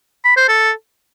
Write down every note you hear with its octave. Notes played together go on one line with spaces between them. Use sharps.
B5
C5
A4